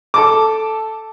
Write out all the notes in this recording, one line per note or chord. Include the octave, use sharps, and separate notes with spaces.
A4 A5 D6